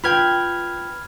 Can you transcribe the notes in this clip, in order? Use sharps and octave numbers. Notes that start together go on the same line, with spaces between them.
F4 B4 G5 B5 F6 G#6